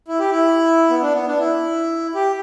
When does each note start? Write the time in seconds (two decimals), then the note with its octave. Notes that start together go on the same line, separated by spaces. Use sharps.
0.08 E4
0.19 G4
0.31 E4
0.90 B3
1.02 D4
1.14 B3
1.27 D4
1.39 E4
2.15 G4